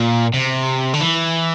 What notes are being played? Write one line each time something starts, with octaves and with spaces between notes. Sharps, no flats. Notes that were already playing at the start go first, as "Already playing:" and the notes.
Already playing: A#2
C3
D3
E3